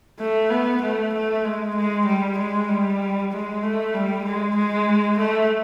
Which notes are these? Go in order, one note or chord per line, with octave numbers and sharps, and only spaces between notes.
A3
B3
A3
A3
G#3
G#3
G3
G#3
G3
G#3
A3
G3
G#3
G#3
A3